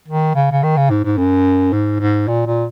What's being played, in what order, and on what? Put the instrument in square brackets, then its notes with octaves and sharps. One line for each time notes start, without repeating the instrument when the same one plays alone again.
[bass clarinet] D#3
C#3
C#3
D#3
C#3
G#2
G#2
F#2
G#2
G#2
A#2
A#2